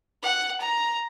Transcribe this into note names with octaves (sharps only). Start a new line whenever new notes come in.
F#5
A#5